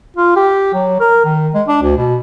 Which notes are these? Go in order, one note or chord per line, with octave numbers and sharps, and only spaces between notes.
F4
G4
F#3
A#4
D#3
G#3
D4
D2
B2